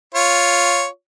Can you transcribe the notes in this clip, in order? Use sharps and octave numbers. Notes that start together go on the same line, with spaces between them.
F4 C#5